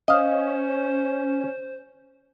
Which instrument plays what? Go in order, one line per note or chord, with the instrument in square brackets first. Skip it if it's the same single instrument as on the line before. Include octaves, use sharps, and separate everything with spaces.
[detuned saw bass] C#4 [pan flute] C5 [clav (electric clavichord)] D#5 F5